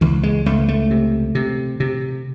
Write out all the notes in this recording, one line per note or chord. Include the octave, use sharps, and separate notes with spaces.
C#2 E3
G#3
C#2 A3
A3
C3
C3
C3